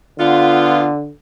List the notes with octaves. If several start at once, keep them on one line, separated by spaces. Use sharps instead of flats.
D3 B3 F4